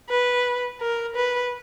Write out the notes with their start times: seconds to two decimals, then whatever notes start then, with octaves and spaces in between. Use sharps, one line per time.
0.09 B4
0.81 A#4
1.15 B4